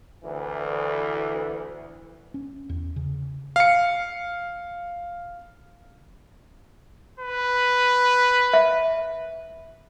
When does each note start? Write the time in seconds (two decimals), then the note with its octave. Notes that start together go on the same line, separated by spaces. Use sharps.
0.24 D2 E3
2.34 C#4
2.69 E2
2.96 C#3
3.56 F5 C#7
7.20 B4
8.53 E5